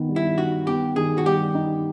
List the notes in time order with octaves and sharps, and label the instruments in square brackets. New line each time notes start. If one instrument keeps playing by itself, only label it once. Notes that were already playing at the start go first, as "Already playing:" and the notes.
Already playing: [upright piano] D#3 B3
G3
[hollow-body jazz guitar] E4
[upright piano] D#4 [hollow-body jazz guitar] F#4
[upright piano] B3 [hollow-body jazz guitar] G4
[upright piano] D#3 [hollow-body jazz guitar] G#4
[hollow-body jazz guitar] F#4
[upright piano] G3 [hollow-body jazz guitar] G4
[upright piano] D#4